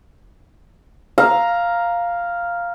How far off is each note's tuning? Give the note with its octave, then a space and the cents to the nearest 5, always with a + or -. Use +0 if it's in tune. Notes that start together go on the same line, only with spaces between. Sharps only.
F5 +0 A#5 +5